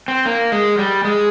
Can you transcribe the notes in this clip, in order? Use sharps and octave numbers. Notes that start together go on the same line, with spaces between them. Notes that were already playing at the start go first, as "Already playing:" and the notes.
C4
A#3
G#3
G3
G#3